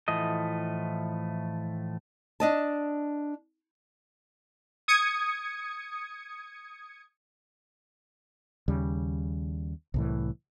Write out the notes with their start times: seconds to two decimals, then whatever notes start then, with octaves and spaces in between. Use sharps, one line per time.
0.08 A2 E3 F3 A3 D#5
2.40 D4 D#5 A5
4.88 D#6 G#6 C#7
8.68 D#2 C#3 G3
9.94 C2 A2 E3